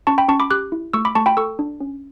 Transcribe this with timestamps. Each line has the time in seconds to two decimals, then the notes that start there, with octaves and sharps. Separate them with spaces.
0.07 C#4 A5 C#6
0.18 G5 B5
0.28 C#4 A5 C#6
0.40 B5 D6
0.50 G4 D6 F#6
0.72 E4
0.94 A3 C#6 E6
1.05 B5 D6
1.15 A3 A5 C#6
1.26 G5 B5
1.37 A4 C#6 E6
1.59 D4
1.80 C#4